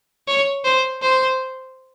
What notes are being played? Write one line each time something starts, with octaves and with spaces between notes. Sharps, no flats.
C#5
C5
C5